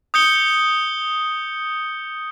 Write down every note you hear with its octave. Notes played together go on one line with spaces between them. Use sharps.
D#6 G6 C#7 G7